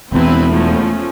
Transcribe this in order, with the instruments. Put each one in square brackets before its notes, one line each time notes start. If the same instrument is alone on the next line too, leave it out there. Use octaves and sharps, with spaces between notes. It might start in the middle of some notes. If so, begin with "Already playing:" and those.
[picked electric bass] E1 E2 [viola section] C4 E4 B4
[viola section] F3 A3 C#4